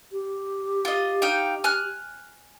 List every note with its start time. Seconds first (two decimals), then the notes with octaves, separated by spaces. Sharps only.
0.12 G4
0.85 F4 D#5
1.22 D#4 F5 G5
1.64 G#5 F6 F#6